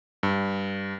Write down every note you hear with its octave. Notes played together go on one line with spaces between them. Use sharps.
G2